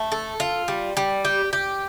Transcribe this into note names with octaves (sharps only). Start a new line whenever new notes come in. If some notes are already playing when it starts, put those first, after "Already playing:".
Already playing: A3
A4
F4
G3
G3
G4
G4